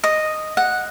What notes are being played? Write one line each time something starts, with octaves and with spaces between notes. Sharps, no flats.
D#5
F#5